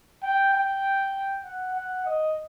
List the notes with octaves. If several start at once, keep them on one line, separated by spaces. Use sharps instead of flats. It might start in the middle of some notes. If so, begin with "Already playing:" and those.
G5
G5
F#5
F#5
D#5